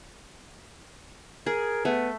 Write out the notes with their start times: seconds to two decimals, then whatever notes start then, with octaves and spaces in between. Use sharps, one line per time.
1.46 G#4 A#4
1.85 A3 B3